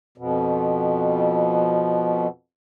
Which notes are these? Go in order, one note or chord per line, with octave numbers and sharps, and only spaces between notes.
F2 B2